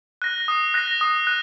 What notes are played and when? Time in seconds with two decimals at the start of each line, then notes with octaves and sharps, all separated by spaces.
0.22 F#6 A#6
0.48 D#6
0.74 F#6 A#6
1.01 D#6
1.27 F#6